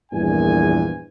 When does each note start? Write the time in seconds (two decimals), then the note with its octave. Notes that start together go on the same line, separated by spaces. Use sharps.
0.12 A#1 E2 G2 A#2 G#5